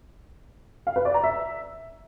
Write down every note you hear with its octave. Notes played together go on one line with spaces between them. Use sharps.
F5
B4
D5
A#5
E5